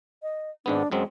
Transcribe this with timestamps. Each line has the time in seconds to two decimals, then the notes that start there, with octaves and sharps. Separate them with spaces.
0.23 D#5
0.66 G#1 G#2 B3 D4
0.92 F#2 F#3 G#3 C4